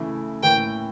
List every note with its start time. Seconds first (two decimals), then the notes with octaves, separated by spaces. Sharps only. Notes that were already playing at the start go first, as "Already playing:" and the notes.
Already playing: C#3 E3 A3 E4
0.43 A2 E3 A#3 C#4 G5